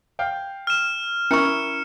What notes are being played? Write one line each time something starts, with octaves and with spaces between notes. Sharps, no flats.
F5 G5
F6 E7
C#4 E4 A#4 C#6 C#7